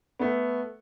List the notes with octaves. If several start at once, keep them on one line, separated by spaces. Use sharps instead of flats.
A3 B3